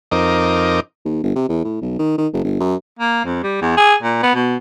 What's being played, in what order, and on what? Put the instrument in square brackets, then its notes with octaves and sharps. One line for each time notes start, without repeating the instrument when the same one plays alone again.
[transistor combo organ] F2 C4 D#4 A#4 D#5 D6
[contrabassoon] D#2
G1
C3
E2
A2
B1
D#3
D#3
F#1
G1
F#2
[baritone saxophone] A#3
F2
G3
E2
G#4
A#2
B3
B2